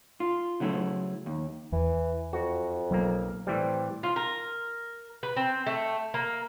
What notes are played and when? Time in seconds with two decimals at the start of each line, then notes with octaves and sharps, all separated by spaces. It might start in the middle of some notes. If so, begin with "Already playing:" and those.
0.20 F4
0.60 C#3 F#3 A3 E4
1.26 D#2
1.72 E2 E3
2.33 F2 F#4
2.91 B1 F#3 A#3
3.47 A2 E3 G3 C4
4.03 F4
4.16 A#4
5.23 B4
5.37 C4
5.66 A3
6.14 A#3